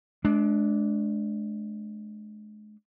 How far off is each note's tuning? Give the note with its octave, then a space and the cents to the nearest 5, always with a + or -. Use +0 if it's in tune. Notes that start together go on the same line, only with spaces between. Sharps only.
G#3 +35 D4 -5